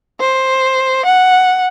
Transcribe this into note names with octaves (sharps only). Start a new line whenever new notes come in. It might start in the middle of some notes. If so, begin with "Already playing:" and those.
C5
F#5